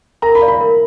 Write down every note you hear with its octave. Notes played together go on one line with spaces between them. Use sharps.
A#4 A#5
B5
D5 F5
B5
A#4